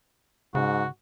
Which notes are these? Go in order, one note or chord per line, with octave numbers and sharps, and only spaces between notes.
G#2 C#3 F#4